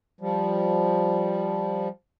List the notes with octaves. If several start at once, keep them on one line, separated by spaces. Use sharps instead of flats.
F3 G3